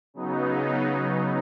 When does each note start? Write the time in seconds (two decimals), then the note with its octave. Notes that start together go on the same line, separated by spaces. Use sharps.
0.14 C#3 F#3 B3 D#4